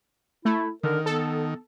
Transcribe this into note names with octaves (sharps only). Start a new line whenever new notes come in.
A3 E4
D3 D#3 A#4
B3 A4